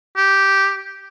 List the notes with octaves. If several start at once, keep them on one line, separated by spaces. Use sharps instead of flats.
G4